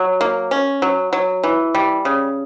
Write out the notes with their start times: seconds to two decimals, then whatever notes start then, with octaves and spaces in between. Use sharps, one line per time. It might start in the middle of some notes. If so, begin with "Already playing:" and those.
Already playing: F#3
0.21 A#3
0.51 C#4
0.82 F#3
1.13 F#3
1.44 E3
1.75 G3
2.05 C#3